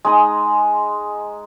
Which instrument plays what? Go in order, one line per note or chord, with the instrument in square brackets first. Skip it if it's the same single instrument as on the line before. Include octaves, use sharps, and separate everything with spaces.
[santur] G#3 D#4 D#6